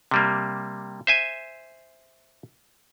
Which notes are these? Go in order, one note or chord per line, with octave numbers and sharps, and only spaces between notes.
C3 G3 A#3
C5 E5 G#5